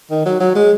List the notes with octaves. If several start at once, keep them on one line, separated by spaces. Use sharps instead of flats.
D#3
F#3
F#3
G#3